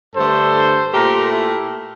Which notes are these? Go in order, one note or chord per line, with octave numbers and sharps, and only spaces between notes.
G2 D3 A3 A4 C5
A#2 A3 G4 A#4
E4 G4